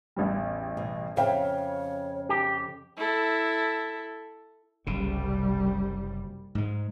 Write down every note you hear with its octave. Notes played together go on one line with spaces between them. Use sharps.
A1 E2 G3
B2
F2 C#3 C#5 E5 F5 G5
G4
E4 A4
F#1 C2 C#3 G3
G#2 G#3